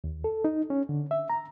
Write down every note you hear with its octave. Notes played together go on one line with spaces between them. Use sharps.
D#2
A4
D#4
C#4
D3
E5
A#5